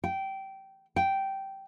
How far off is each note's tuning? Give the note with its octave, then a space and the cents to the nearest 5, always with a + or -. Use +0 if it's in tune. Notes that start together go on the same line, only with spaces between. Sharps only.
G5 -15
G5 -10